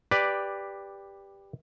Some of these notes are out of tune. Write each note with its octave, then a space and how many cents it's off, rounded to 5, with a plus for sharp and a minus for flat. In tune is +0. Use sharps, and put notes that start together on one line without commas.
G4 +10 B4 +0 D5 +0